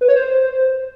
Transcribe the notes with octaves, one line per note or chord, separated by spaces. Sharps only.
B4
C#5
C5